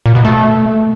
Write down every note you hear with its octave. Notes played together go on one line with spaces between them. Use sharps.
A#2
B2
A3